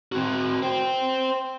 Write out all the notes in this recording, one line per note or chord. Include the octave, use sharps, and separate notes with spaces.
C4 F#4
C5 G5